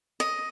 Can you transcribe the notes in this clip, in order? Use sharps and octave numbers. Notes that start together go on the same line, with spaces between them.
D#5